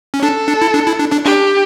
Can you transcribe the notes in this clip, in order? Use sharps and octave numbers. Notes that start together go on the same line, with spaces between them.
C#4
D4 A4
D4
E4
D4
E4
D4
D4
D4 G4